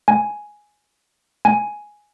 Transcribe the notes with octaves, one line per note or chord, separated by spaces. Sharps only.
G#5
G#5